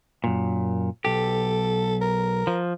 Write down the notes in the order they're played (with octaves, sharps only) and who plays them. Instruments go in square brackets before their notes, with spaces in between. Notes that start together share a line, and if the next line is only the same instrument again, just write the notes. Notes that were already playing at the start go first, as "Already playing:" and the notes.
[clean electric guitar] F#2 A#2
[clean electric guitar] B1 G4 [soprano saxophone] A4
[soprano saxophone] A#4
[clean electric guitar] F3